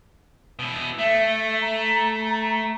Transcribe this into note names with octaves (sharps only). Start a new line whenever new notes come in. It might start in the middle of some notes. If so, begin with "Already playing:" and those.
B2 E4
A3 E5
A#5